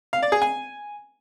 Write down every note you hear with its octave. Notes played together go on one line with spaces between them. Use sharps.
F5
D5
G#4
G#5